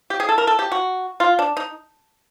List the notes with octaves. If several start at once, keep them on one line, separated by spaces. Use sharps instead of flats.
G4
G#4
A4
A#4
A4
G4
F#4
F4
D4
D#4